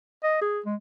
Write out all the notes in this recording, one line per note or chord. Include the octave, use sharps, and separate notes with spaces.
D#5
G#4
G#3